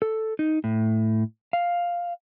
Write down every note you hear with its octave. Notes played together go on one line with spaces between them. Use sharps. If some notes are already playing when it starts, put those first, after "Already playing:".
A4
D#4
A2
F5